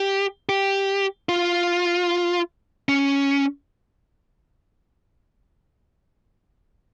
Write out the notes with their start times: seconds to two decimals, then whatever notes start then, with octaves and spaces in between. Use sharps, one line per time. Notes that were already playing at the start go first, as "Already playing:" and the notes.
Already playing: G4
0.49 G4
1.29 F4
2.89 C#4